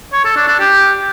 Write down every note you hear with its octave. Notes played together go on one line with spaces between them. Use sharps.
C#5
A4
D4
D4
G4